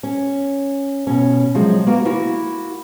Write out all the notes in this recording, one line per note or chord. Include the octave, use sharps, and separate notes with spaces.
C#4
B2 C#4
C3 F3 F#3 G#3
A#3 B3 F#4 A#5
A#3 E4 F#4